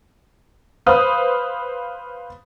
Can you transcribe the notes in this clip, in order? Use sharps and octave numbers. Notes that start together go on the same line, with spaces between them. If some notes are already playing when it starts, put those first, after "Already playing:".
B4 C5 F5 D#6